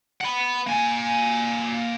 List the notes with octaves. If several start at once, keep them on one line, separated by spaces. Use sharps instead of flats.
F#5 B5
A#3 G#5